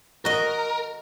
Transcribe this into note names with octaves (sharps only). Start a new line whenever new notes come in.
F#4 A#4 D#5